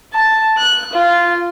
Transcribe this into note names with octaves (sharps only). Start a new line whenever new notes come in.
A5
F#6
F4